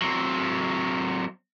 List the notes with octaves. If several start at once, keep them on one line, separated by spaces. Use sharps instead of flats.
F#3 C4